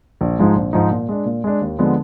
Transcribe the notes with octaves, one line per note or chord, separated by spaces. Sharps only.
A#1
G#2 F3 G#3 D#4
A#1
G#2 F3 G#3 D#4
A#2
G#3 D4
A#2
G#3 D4
D#2
D3 F3 G#3 B3